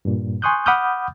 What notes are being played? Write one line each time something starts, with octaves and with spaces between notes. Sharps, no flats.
G2 A#2
G#5 C6 C#6 D#6 F#6 G6
F#5 B5 D6 D#6 F6 G6